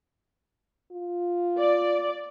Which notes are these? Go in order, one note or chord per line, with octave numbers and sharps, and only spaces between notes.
F4
D5